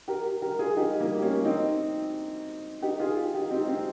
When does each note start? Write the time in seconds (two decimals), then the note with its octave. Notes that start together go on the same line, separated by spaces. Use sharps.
0.08 G4 A#4
0.42 G4 A#4
0.59 F4 G#4
0.76 D#4 G4
1.00 G3 A#3
1.22 A#3 C#4
1.45 C4 D#4
2.82 D#4 G4
3.00 F4 G#4
3.34 D#4 G4
3.51 C4 D#4
3.68 C4 D#4